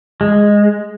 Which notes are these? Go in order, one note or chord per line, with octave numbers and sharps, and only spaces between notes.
G#3